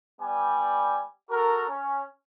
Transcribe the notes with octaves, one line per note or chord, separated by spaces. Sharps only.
G3 B3 D5 G5 G#5
F#4 A4 A#4
C#4